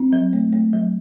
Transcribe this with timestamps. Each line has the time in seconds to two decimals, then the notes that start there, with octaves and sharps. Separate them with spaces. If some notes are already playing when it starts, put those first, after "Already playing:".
Already playing: C4
0.13 F#3
0.33 A3
0.53 A3
0.73 F#3